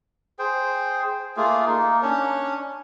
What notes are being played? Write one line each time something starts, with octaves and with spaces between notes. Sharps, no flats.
G#4 C5 G5
A3 A#3 F4 G#4
A#3 D#4
C#4 D4 C#5